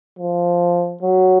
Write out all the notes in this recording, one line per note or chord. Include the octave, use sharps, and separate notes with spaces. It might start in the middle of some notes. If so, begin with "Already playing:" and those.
F3
F#3